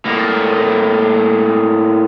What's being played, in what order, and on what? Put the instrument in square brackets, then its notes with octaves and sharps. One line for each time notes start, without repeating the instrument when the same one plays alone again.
[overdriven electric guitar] A2 A#3